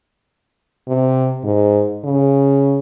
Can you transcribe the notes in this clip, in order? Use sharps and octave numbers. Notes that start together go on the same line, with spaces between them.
C3
G#2
C#3